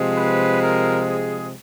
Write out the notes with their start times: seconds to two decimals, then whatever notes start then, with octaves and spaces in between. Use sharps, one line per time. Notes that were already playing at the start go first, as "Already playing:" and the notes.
Already playing: C3 F3 G#3
0.17 B4
0.62 A#4
1.07 G#4